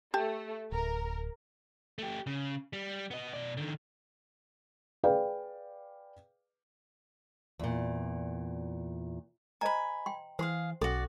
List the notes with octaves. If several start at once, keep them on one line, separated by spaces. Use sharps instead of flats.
A3 G4 A5
D1 A#4
A3 G4
C#3
G3
B3 D#5
B2 D5
D3 D#3
G#4 B4 D5 F5 G5
E2 A#2
C5 D#5 G#5 A#5 B5
G5 C6
E3 G#4 C5 F5 C6
B1 C#4 F#4 A4 D5 C6